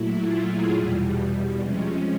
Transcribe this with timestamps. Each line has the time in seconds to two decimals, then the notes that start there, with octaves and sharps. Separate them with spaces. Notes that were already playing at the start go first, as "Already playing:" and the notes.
Already playing: A#2 F#3 A3 E4
0.17 F4
0.46 G#4
0.75 E2 B2 G3
1.61 C3 F3 G#3 C#4